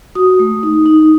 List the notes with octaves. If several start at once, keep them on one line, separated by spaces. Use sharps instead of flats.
F#4 D#6
A3
D#4
D#4